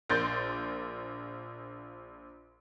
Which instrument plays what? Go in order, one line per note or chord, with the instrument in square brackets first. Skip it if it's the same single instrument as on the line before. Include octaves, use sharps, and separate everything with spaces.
[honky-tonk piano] A#1 A#3 C6 G6 A6